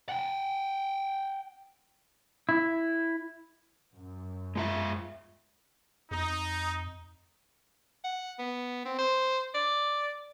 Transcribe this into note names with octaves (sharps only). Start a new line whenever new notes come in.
F#5 G5
E4
F#2
G#3 F4 E5
F2 D#4
F#5
B3
C4
C5
D5